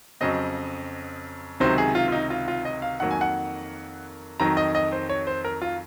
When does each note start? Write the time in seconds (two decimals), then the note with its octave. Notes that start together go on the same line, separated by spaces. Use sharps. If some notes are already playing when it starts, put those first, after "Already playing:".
0.21 F2 C#3 F#3 C4 D#5
1.60 C#2 C3 D#3 F#3 C5
1.78 G#4
1.95 F4
2.08 F4
2.12 D#4
2.30 F4
2.48 F4
2.65 D#5
2.82 F5
3.00 F2 D#3 F#3 A#3 F#5
3.11 G#5
3.21 F#5
4.40 F2 D#3 F#3 A#5
4.57 D#5
4.75 D#5
4.92 C5
5.09 C#5
5.27 C5
5.45 A#4
5.61 F4